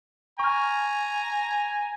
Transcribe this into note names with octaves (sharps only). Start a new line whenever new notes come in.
G#5 A#5 C#6 F6